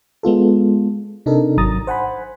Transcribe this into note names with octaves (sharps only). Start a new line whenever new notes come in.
G#3 B3 F4 A4
C3 D4 D#4 A4 A#4
G#1 F#3 A#5 D#6 A6
C5 F#5 G#5 B5